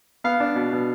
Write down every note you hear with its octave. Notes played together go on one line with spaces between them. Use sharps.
B3 F5
D4
B2
B2